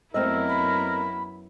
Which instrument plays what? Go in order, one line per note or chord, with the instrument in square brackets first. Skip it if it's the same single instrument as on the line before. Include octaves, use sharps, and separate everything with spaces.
[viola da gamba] F#2 B3 E4 [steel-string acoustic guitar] A3 C4 D#5 [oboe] A#4 [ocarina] E6
[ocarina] B5